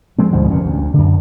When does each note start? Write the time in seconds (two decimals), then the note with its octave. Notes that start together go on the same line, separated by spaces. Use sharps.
0.19 F3 G#3 C4
0.32 D2 G#2 B2 F3
0.51 F1 D#2 A#2 C#4
0.65 D2
0.94 F#2 D3